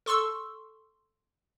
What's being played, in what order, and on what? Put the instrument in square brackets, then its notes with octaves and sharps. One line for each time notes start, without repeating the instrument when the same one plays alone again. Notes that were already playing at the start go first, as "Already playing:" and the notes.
[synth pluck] A4 C6 C#6 E6